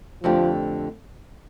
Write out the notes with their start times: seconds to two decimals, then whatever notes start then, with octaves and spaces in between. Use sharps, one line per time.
0.24 F2 D3 F3 A3 D4 G4